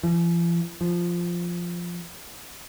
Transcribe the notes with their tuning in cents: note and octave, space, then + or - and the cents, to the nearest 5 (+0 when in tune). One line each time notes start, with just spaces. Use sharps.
F3 -45
F3 -5